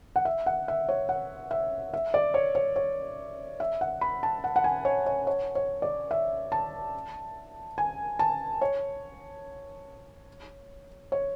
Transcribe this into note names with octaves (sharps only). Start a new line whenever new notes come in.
F#5
E5
F#5
E5
C#5
F#5
E5
E5
D5
C#5
C#5
C#5
E5
F#5
B5
A5
F#5
F#5
G#5
C#5
C#5
C#5
C#5
D5
E5
A5
G#5
A5
C#5
C#5